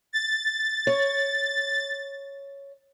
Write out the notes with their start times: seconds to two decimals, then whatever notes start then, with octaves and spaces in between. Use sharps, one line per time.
0.13 A6
0.87 C#5